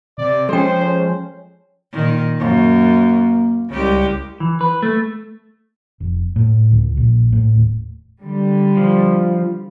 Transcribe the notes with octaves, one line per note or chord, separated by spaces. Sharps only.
C3 D5
F3 G#3 C#4 A4 C5 G5
C#5
A#2 D#3
F#2 A#3
C2 C#3 G#3 G4
E3
B4
A3
F1
A2
C#2
A#1
A2
D#1
D3 G3
F3